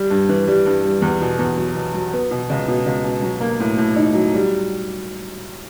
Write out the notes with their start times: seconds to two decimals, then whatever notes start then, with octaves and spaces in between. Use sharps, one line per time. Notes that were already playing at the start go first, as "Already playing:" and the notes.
Already playing: G3
0.10 G2
0.29 E3
0.47 G3
0.66 G2
0.83 G3
1.02 E2
1.21 B2
1.39 E2
1.58 F#3
1.75 B2
1.94 F#3
2.13 B3
2.31 B2
2.50 C#2
2.68 B2
2.86 C#2
3.04 B2
3.22 F#3
3.41 A#3
3.60 A2
3.78 A2
3.96 D#4
4.14 F#3
4.34 G3